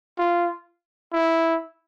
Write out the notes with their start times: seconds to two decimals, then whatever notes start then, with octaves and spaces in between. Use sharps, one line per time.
0.18 F4
1.13 E4